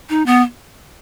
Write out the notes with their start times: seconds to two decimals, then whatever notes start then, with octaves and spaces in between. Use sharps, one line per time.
0.09 D#4
0.26 B3